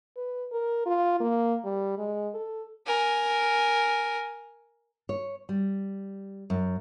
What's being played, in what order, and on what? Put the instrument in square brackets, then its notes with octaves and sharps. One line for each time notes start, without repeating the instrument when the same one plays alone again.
[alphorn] B4
A#4
F4
A#3
G3
G#3
A4
[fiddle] A#4 G#5
[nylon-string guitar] C#5
G3
F#2